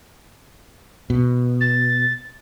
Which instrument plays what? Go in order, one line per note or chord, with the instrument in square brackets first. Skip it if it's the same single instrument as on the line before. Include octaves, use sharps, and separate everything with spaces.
[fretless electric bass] B2
[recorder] A6